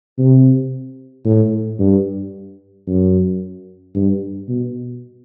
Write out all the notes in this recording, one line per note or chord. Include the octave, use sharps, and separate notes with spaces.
C3
A2
G2
F#2
G2
B2